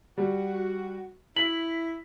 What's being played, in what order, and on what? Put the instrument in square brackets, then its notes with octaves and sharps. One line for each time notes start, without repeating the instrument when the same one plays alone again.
[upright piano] G3 [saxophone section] F#4
[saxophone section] E4 [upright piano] B6 [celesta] F#7